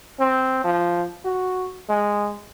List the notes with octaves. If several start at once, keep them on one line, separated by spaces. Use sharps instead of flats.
C4
F3
F#4
G#3